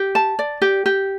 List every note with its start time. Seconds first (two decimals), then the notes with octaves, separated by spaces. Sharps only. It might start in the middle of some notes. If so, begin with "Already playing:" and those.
Already playing: G4
0.15 A5
0.39 D5
0.62 G4
0.86 G4